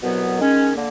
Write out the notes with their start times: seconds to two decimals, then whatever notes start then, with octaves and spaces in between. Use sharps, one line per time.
0.02 C2 B2 F#3 B3
0.39 D#3 G#3 C#4
0.75 D3 A#3